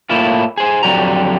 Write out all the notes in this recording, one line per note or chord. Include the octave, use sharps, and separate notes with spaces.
A2 A#3 E4 F4
G#4 C5
F2 D3 F#3 G3 A#5